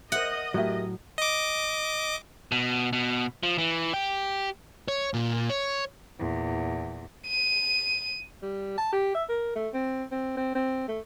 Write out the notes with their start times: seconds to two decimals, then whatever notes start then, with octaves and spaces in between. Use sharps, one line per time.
0.12 A#4 C5 D#5 E5 F#5
0.54 A2 F#3 G4 A#4 E5
1.18 D#5 D6
2.52 B2
2.93 B2
3.43 F3
3.58 E3
3.94 G4
4.88 C#5
5.14 A#2
5.50 C#5
6.18 E2 A#2
7.27 D#7
8.42 G3
8.78 A5
8.93 G4
9.15 E5
9.29 A#4
9.56 A3
9.74 C4
10.11 C4
10.37 C4
10.55 C4
10.88 A3